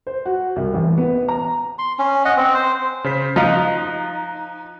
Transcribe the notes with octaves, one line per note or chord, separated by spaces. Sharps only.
C5
F#4
C2
A1
B3
A#5
C6
C#4
D#5 F#5
C4
C5
C#3 C5 B6
F3 D#4 F4 A#5 F#6